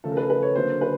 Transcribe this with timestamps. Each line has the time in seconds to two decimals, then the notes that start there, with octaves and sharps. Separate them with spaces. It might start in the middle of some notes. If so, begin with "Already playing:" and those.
0.04 C#3 F3 A3 A4
0.11 A#4
0.17 B4
0.30 B4
0.43 C#5
0.55 D3 F#3 A#3 C5
0.81 B4